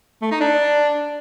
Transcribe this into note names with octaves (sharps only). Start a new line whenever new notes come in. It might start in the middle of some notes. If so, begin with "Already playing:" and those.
A3
D#4
D4